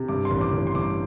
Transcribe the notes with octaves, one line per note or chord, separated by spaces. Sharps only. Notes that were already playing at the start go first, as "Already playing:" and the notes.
Already playing: C3
G2 D6
C6
A1
D6
A1
C6
G2 D6